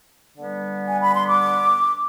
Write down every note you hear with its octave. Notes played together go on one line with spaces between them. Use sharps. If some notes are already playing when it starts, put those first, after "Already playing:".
D3 G3 B3
G#5
B5
C6
D6